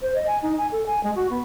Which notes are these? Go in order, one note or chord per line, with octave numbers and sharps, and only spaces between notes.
C5
D#5
G#5
D#4
G#5
A4
G#5
G#3
F#4
B3